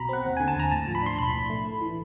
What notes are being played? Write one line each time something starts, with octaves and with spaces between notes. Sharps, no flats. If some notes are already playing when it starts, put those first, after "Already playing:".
Already playing: B1 B2 A#5 B5
C4 F#5
D#2
D3 G#5
A5
D#2 A#5
A2 A5
F3
B5
D4 C6
B1 B5
A2
A3
A2
E3